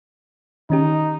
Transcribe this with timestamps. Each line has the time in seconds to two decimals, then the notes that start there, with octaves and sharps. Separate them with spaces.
0.70 D#3 C#4 D#4 G4